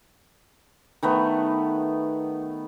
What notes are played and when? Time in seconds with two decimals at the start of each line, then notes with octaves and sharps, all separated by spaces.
1.03 D#3 A3 B3